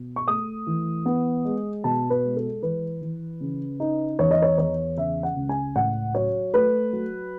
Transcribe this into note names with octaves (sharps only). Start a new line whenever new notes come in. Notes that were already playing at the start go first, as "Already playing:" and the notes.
Already playing: B2
C#6
A3 D#6
E3
B3
G#3
B2 A5
B4
G#3
A4
E3 B4
E3
C#3
D#4
E2 C#5
D#5
C#5
E2 C#5
C#3 E5
F#5
C#2
G#5
A2 F#5
F#3 C#5
A3 B4
F#3